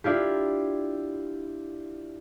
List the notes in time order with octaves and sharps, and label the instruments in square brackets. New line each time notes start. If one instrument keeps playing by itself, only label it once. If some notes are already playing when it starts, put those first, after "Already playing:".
[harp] D4 E4 F4 G4